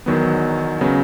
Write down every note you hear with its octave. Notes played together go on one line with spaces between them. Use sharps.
E2 D#3 F#3 B3
C#3 F#3 B3